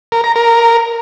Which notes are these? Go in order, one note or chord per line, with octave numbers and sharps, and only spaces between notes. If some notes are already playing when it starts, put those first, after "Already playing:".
A#4
A#5
A#4